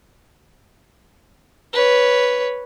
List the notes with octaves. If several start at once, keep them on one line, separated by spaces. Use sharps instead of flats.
B4 C#5